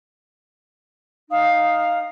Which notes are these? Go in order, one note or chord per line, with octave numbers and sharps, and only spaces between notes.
D#4 F5 D#6